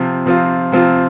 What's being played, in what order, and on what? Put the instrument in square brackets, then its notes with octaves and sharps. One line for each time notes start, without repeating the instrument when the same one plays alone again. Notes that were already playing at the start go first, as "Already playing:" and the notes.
Already playing: [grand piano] C3 F3 C4 F4
C3 F3 C4 F4
C3 F3 C4 F4